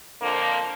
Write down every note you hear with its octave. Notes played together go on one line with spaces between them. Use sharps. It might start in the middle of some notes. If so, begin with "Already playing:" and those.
F2 D3 F3 A#3